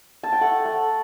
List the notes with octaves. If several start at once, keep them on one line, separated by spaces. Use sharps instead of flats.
A5
G5
A3 F#5
A3